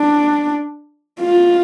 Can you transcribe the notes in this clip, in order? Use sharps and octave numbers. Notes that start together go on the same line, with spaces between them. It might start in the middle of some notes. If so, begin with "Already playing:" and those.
Already playing: D4
F4